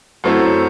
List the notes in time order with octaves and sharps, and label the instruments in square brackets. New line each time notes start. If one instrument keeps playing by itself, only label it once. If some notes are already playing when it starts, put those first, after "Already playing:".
[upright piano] F#2 F#3 A3 C4 E4